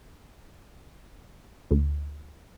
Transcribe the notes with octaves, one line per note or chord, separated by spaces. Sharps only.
D2